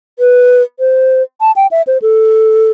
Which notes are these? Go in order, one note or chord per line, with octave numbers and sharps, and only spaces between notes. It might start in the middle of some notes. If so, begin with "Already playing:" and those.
B4
C5
A5
G5
E5
C5
A4